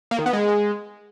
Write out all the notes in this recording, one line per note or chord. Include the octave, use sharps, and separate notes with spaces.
A#3
D#3
B3
G#3